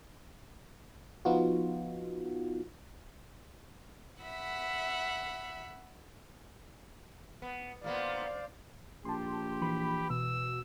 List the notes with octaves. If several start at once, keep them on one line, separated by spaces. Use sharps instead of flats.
F3 B3 D#4 F4 F#4
E5 F#5 B5
B3
A#2 A#3 B3 C5 D5 F5
A#1 G4 A5 C6
E3 B5
B2 E6